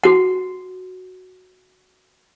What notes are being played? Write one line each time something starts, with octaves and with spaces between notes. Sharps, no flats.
F#4 F#5